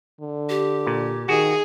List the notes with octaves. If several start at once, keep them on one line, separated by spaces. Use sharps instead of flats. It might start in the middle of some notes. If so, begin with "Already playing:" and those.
D3
G4
A#2
D#3 F#4 G#4